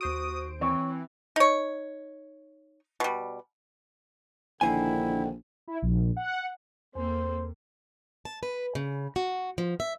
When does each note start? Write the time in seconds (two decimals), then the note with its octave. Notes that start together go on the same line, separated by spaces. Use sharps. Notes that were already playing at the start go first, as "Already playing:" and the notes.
0.01 D#2 F#4 C5 D#6 D7
0.61 E3 C4 C#5
1.36 D#4 C#5
3.00 B2 G3
4.61 A#1 D3 D#3 E4 C5 G#5
5.68 E4
5.82 A#1
6.17 F#5
6.95 E2 A#3 C4 A4 C5
8.25 A5
8.43 B4
8.75 C#3
9.16 F#4
9.58 F3
9.80 E5